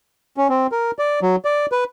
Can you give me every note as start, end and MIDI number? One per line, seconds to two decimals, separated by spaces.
0.37 0.48 61
0.49 0.67 60
0.72 0.91 70
0.99 1.20 74
1.22 1.36 54
1.45 1.66 74
1.72 1.84 71